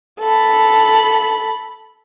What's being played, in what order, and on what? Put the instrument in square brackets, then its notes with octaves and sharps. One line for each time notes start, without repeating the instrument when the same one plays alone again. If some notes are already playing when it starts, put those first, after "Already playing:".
[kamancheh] A4 B5